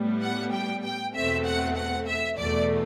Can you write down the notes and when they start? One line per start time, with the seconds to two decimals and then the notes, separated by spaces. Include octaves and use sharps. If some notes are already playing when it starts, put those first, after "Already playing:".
Already playing: A2 G3 B3
0.22 F#5
0.53 G5
0.84 G5
1.14 E2 B2 A3 C4 E5
1.46 F#5
1.77 F#5
2.07 E5
2.38 E2 B2 A3 D5